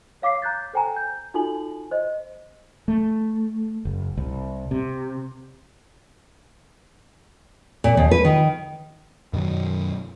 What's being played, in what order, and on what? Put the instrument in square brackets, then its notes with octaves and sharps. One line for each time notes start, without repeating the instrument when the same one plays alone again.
[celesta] C#5 F5 D6 B6 C7
A#5 F#6 G6 A6
A4 C5 G5 G#5 A#5
G6
D#4 F4 F#4 A4 G#5 F#7
C5 D#5
[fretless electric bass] A3
F#1
C2
C3
[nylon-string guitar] A#2
D#2
B4
D#3
[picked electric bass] F#2 B2 D#3 F#3